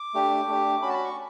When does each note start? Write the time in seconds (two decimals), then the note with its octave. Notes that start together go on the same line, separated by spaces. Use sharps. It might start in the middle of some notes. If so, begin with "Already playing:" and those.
Already playing: D6
0.14 A3 D4 G4
0.48 A3 D4 G4
0.82 C#4 B5
0.85 F#4 A5
0.94 B5
1.05 C#6